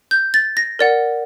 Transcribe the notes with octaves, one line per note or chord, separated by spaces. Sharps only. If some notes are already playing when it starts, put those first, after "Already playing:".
G6
A6
A#6
A#4 D5 F#5